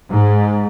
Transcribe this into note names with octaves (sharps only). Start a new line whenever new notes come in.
G#2